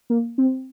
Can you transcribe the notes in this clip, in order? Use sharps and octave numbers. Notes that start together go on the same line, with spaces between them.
A#3
C4